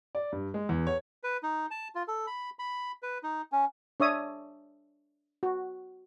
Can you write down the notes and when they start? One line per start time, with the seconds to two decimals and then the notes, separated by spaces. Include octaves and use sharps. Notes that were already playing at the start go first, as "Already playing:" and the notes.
0.15 D5
0.32 G2
0.54 G#3
0.69 E2
0.87 C#5
1.23 B4
1.43 D#4
1.71 A5
1.95 F4
2.08 A4
2.27 B5
2.59 B5
3.03 B4
3.23 D#4
3.52 C#4
4.00 D4 C#5 E5 D#6
5.43 F#4